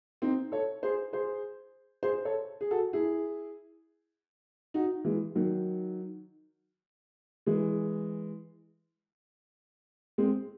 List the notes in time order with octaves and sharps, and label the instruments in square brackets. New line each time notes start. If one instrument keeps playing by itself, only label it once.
[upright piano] C4 D#4
A4 C#5
G#4 C5
G#4 C5
G#4 C5
A4 C#5
G#4
F#4 A4
E4 G#4
D#4 F#4
E3 G#3
D#3 F#3
E3 G#3
G#3 C4